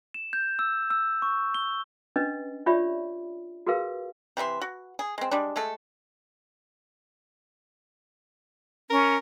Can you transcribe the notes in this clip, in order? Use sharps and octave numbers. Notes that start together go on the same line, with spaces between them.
E7
G6
E6
E6
C#6
G7
C#4 D4 B4 D#5
F4 G4 C#5 D5 E5 B5
F#4 G#4 A#4 B4 F5
C3 E3 E5 C6
F#4
G#4
G#3 C4
G3 G#3 D4
G#3 A3 A4
C#4 A#4